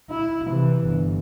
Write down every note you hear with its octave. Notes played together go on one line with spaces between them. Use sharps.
E4
C3 E3
G1